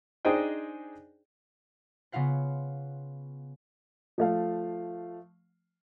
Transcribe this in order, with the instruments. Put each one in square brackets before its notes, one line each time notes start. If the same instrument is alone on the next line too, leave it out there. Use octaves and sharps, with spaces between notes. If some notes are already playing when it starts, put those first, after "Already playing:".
[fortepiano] D4 D#4 G#4 C5 D#5 G5
[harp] C#3 B3 F4 F5 F#5
[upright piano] F3 A3 F5